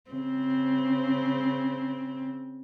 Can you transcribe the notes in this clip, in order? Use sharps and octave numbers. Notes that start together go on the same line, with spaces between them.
C#3 C4